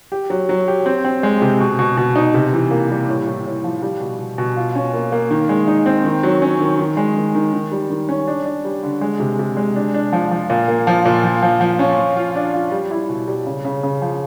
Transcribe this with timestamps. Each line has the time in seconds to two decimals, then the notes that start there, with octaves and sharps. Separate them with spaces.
0.12 G4
0.30 F#3
0.49 F#3
0.68 G4
0.86 C4
1.04 C4
1.23 G#3
1.41 C3
1.60 B2
1.79 B2
1.97 B2
2.16 D#4
2.34 C3
2.53 E3
2.71 A#3
2.90 G3
3.09 A2
3.27 A2
3.45 A2
3.64 F3
3.82 G3
4.00 B2
4.19 B2
4.38 B2
4.57 F4
4.75 C#4
4.94 A#3
5.12 A#3
5.31 D#3
5.49 G#3
5.67 D#4
5.86 C4
6.05 D#3
6.23 F#3
6.42 C#4
6.60 D#3
6.79 D#3
6.97 G#3
7.16 D#3
7.35 D#3
7.53 D#3
7.72 G3
7.90 D#3
8.09 C#4
8.27 D4
8.46 D4
8.65 G3
8.83 D3
9.01 G#3
9.20 C3
9.39 C3
9.57 G#3
9.76 D4
9.94 D4
10.13 F3
10.31 F3
10.50 A#2
10.68 A#3
10.87 F3
11.05 A#2
11.24 F3
11.42 F3
11.61 F3
11.79 C#4
11.97 F3
12.16 F4
12.35 D4
12.53 F4
12.72 G3
12.91 E4
13.09 B2
13.28 G3
13.46 C#3
13.65 C#3
13.83 C#3
14.02 F3